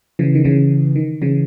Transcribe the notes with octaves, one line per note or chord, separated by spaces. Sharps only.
C#3 E3
D#3
C#3 E3
D#3
C#3 E3